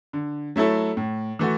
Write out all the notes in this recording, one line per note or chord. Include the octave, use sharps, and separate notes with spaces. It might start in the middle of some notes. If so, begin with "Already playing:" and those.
D3
F#3 A3 E4 A4
A2
E3 A3 F#4